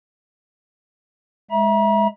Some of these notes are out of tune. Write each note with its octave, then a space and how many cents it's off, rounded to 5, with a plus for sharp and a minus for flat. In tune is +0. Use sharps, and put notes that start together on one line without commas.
G#3 +0 E5 +0 A#5 +40